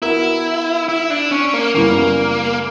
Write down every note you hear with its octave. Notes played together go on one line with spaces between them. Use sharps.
E3 B3 E4 F#4 A#4
E4
D4
C#4
A#3
F#2 C#3 E3 G3 A#3 B3